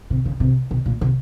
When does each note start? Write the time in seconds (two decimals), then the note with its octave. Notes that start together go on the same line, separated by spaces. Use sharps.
0.10 C3
0.25 C#3
0.40 C3
0.71 B2
0.86 A#2
1.01 C3